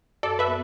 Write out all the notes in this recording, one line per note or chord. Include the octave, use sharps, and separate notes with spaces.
F#2 A4 D5
B4 E5
B3